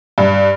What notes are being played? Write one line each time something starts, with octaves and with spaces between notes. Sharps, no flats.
G2